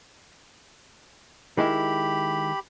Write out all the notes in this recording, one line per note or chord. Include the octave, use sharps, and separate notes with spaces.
D#3 G#3 E4 G4 B5